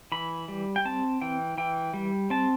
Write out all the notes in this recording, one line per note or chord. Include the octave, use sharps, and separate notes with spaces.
E3 B5
G3
G5
C4 A5
E3 G5
E3 G5
G3
C4 A5